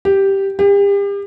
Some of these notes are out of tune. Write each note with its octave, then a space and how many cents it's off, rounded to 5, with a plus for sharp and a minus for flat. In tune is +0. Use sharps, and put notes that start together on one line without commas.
G4 -5
G4 +35